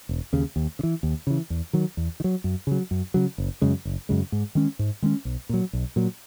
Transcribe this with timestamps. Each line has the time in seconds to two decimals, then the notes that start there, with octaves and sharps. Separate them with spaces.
0.09 E1
0.33 D#2 C#3
0.56 D#2
0.79 C#3
0.83 E3
1.03 D#2
1.27 C#3 E3
1.50 E2
1.73 D#3 F#3
1.97 E2
2.20 D#3
2.24 F#3
2.44 F#2
2.67 C#3 F#3
2.91 F#2
3.14 C#3 F#3
3.38 F#1
3.62 F#2 C#3 G#3
3.85 F#1
4.09 F#2 C#3 G#3
4.32 G#2
4.55 D#3 G#3 C#4
4.79 G#2
5.02 D#3 G#3 C#4
5.25 B1
5.49 A#2 F#3
5.73 B1
5.96 A#2 F#3